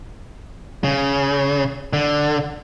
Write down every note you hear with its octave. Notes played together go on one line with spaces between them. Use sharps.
C#3
D3